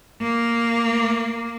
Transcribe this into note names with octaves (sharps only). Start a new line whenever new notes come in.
A#3